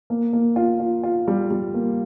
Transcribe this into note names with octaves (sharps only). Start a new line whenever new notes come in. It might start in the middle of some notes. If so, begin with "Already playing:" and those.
A#3
A#3
F4
F4
F4
G3
G3
A#3